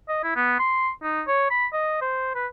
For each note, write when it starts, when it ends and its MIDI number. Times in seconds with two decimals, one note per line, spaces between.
0.08 0.23 75
0.23 0.31 64
0.36 0.57 59
0.59 0.90 84
1.02 1.22 63
1.27 1.49 73
1.50 1.66 83
1.73 1.98 75
2.01 2.33 72
2.35 2.47 71